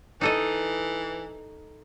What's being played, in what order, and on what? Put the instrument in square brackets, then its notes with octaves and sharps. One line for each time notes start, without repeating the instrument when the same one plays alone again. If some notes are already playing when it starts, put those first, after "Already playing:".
[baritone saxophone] E3 [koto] D#4 A4 D#5